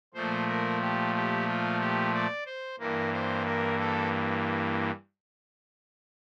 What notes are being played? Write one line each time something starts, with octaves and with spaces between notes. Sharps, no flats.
A#2 F3 A3 C5
A#4
G4
G4
F4
G4
D5
C5
G2 E3 A#3 A#4
C5
A#4
A4